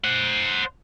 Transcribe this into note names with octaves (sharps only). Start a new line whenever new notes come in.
C5 F#5